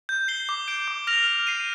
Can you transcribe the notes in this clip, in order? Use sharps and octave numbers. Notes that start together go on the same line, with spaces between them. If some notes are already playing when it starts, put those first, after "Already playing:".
G6
C7 G7
D6
G6 D7 G7
D6
F6 A#6 F7
F6
C7 D#7